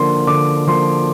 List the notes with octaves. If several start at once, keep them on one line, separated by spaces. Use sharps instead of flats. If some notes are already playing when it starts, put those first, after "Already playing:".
Already playing: D3 F3 A#3 C6
D3 D6
F3 A#3 C6